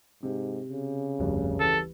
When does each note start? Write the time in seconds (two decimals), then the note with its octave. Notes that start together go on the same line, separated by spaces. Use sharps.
0.23 G#2 C3
0.69 C#3
1.19 F1 D2 G2
1.60 E3 G3 A4